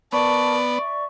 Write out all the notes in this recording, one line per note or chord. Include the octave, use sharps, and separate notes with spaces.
B3 A#4 D5 A5 C#6
D5 E5 C#6